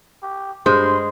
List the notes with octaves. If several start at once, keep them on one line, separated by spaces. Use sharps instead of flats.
G4
G2 G#3 C5 C6